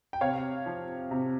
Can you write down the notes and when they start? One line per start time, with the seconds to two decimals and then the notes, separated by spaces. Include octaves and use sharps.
0.13 G5
0.21 C3 C#5 F5
0.66 F3
1.11 C3